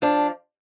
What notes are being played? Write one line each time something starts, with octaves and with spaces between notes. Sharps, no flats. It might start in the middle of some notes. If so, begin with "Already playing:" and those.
F3 D4